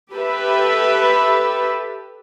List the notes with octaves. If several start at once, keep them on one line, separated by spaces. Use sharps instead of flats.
G4 A4 B4 E5